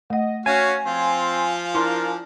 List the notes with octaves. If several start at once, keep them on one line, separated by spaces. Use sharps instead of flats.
A3 D#5 F#5
C#4 F#4 C#5 F5 G#5
F3 C4 F4 C6
D4 E4 A#4 C6